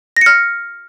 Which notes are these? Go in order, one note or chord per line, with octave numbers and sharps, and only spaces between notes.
F6 A#6 C#7